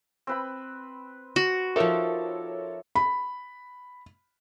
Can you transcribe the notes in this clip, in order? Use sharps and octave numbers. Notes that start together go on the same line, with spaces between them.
C4 B4 B5
F#4
F3 D#4 A4 A#4 C#5 E5 D6
B5